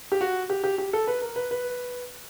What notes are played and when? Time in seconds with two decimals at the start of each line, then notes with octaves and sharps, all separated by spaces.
0.12 G4
0.21 F#4
0.50 G4
0.64 G4
0.78 G4
0.93 A4
1.07 B4
1.22 A#4
1.36 B4
1.51 B4